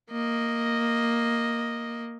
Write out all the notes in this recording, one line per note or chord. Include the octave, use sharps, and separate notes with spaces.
A#3 D#5